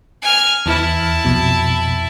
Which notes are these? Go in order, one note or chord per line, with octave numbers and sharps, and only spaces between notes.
G#5 F6
E2 E3 E4 A5 F6
B1 F2 B2